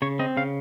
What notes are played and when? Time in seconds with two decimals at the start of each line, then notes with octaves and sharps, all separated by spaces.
0.02 C#3 C#5
0.19 C4 D#5
0.37 C#3 F5